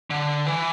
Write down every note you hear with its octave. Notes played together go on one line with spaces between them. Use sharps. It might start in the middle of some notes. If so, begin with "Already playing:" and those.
D3
E3